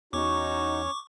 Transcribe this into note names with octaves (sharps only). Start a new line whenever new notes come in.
E2 C#4 D#4 F#4 C#5 C#6 D6